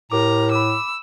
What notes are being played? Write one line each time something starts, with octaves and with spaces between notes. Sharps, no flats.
A2 G4 A#4 A#5 D6
B5 D6 E6